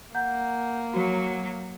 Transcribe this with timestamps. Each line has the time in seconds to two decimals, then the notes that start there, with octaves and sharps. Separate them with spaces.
0.15 A#3 F#5 A#5 G6
0.94 F#3 F#4